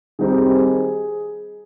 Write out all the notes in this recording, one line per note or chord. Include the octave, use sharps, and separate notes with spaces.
D#3 G3 C4 D#4 G#4
G4
G#4